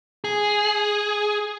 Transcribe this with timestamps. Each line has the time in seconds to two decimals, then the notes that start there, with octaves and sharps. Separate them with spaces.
0.24 G#4